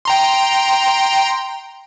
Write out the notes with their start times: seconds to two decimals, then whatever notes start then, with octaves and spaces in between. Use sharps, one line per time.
0.05 G5 A#5 C6